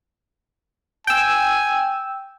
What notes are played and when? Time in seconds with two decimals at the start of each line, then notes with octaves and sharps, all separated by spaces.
1.07 G5 G#5 E6